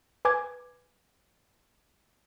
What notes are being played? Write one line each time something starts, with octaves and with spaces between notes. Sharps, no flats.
B4 G#5 D6 G#6